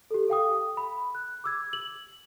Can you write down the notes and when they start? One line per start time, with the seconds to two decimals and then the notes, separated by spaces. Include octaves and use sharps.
0.11 G4 A4
0.28 A4 F5 G5 D#6
0.77 B5
1.15 F#6
1.44 D6 E6 G#6
1.73 F#7